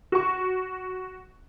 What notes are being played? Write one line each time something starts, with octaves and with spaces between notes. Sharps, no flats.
F#4 C#6